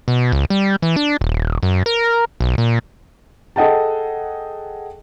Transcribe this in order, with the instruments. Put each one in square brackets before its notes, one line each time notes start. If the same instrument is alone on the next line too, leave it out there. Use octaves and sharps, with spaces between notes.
[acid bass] B2
C#2
G3
E3
D4
D#1
F#2
A#4
B1
A#2
[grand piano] G#4 A4 D#5 F#5 G5 A5